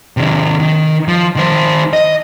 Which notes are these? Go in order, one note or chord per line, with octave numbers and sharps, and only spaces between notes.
C3 D#3
D#3
F3
D#3 C5
D#5